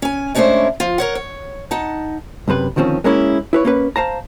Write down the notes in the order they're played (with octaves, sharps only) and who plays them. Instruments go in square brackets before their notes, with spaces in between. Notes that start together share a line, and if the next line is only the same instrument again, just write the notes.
[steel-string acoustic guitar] C#4 G#5
G#3 A3 C#4 D4 E4 C5
F3 F4
A#4 C#5 F#5
C#5
D#4 F#5 A5
[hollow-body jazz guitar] B1 F#2 C3 B4
D2 D#3 F3 C4 C#4
G#3 A#3 C#4 E4
E4 B4 C#5
A#3 C#4 B4
C5 F5 A5 A#5